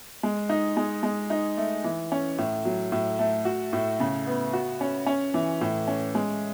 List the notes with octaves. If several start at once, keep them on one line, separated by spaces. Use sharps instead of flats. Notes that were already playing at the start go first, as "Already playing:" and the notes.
G#3
D#4
G#3
G#3
D#4
A3
E3
C#4
A2
F#3
A2
A3
F#4
A2
C#3
B3
F#4
C#4
C#4
E3
A2
C#4
G#3